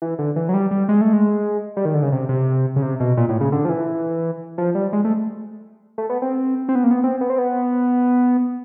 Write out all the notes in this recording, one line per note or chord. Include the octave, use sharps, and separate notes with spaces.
E3
D3
E3
F#3
G3
G3
G#3
A3
G#3
G3
D#3
D3
C#3
C3
C3
C#3
C3
B2
A#2
A2
C#3
D3
F3
E3
F3
G3
G#3
A3
A3
B3
C4
C4
B3
A#3
B3
C4
B3
C4
B3